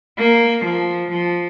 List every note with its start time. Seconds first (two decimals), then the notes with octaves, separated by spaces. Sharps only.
0.18 A#3
0.65 F3
1.11 F3